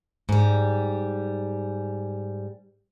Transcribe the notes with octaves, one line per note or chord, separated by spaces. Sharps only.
G#2 G3